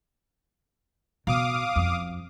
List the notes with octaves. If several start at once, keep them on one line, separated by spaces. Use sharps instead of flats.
B2 F5 D6 D#6
F2